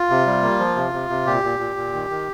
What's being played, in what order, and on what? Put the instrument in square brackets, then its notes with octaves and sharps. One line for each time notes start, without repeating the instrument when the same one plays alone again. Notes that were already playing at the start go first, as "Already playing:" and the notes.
Already playing: [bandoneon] F4
C3
G3
A#3
F3
C3
C3
C3
A#2 G4
A#2
A#2
A#2
D#3
D#3